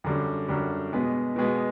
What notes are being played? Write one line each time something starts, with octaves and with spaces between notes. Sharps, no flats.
F#2 D3 G3
F#2 D3 G3
B2 G#3 B3
B2 G#3 B3